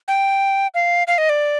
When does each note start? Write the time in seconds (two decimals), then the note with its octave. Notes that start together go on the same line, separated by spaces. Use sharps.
0.08 G5
0.74 F5
1.07 F5
1.18 D#5
1.29 D5